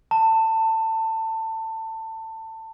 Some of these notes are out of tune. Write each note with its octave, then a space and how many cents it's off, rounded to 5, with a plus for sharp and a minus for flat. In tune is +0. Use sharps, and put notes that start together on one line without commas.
A5 +20